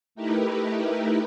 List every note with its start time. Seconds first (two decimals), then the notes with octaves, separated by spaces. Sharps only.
0.15 A3 D#4 E4 G4 A#4 B4